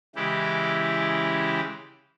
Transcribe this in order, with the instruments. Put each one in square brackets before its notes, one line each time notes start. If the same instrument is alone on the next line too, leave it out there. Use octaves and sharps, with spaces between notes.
[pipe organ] C#3 E3 G#3 E4 G4